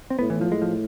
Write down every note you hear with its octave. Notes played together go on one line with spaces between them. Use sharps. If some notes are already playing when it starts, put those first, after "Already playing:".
C4
A2 B3
E3
F3
A2 G#3
F3